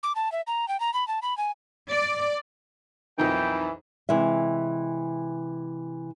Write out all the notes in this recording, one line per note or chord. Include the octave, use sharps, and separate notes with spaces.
D6
A5
E5
A#5
G5
A#5
B5
A5
B5
G#5
D5
B1 F2 E3 D#4 A#4 G5
C3 E3 G#3 E5